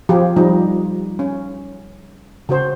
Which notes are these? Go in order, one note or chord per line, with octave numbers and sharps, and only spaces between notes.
F3 F4 G4 G#4
F3 G3 D#4
C#4
C#3 F#4 C5